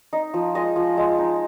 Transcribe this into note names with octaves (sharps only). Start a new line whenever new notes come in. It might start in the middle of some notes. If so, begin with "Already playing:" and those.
D#4
F3
G#3 D#5
F3
G#3
D#4